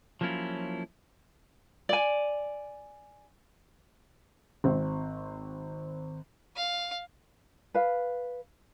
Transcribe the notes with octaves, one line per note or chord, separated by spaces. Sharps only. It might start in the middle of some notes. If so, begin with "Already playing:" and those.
F3 F#3 A#3 C#4 E4 F4
D5 G#5
G#1 C4
F5
B4 F5